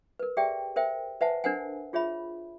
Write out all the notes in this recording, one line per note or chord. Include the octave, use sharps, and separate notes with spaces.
A#4 B4
G4 G#4 D5 E5 G5
A#4 C5 E5 G5
B4 C5 E5 F#5 G#5 A5
D4 A#4 C5 F#5 G#5
F4 G#4 C#5 E5 B5